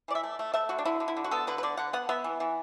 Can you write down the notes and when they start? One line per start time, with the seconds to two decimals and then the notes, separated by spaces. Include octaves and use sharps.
0.08 E3 D5
0.15 E5
0.23 A3
0.39 A3
0.54 A3 E5
0.69 D3 F#4
0.78 D4
0.85 D3 E4
1.00 D3
1.08 E4
1.17 D3
1.24 F#4
1.31 B3 A4
1.47 D3 B4
1.58 B4
1.63 D3 D5
1.77 D3 F#5
1.93 B3 F#5
2.09 B3 E5
2.24 E3
2.40 E3